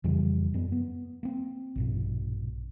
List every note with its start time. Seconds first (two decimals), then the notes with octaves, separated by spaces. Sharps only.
0.04 F2 C#3 E3 G3
0.54 F#2 F#3 B3
0.72 B3
1.23 A#3 C4
1.76 A#1 G2 B2